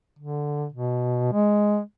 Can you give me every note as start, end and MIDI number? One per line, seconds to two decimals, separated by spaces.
0.19 0.67 50
0.73 1.28 47
1.33 1.81 56